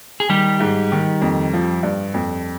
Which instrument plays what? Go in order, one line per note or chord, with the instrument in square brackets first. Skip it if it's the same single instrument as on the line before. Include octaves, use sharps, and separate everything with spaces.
[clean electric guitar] G#4
[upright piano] D#3 [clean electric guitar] G3 G4
[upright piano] G#2
D#3
F2
F3
G2
F2